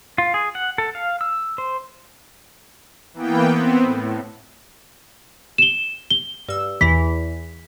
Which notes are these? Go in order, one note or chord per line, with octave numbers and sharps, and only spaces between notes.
F4
G#4
F#5
A4
F5
E6
C5
E3 A#3 B3 G5
B3 C4
A2
E7 G7
G7
G2 E6
E2 E3 B6